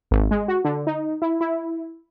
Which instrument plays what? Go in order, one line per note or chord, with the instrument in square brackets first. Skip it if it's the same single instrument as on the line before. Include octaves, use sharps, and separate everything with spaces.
[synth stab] G#1
G#3
F#4
D3
D#4
E4
E4